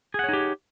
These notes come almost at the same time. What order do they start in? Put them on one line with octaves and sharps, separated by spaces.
G#4 F#5 C#5 D#4 G4